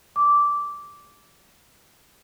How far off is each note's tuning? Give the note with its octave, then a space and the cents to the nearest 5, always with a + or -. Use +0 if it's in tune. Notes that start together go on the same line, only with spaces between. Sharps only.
D6 -10